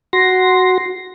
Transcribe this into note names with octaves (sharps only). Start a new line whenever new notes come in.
F#4 C6 A#6